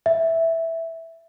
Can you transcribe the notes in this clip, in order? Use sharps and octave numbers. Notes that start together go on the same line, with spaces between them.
E5